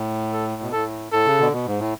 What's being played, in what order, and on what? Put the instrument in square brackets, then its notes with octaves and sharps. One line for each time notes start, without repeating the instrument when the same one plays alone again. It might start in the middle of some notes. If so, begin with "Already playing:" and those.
Already playing: [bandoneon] A2
[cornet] A4
[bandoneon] B2
[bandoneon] A2 [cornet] A4
[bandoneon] A2 [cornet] A4
[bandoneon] C#3
B2 D3
B2
G#2
A2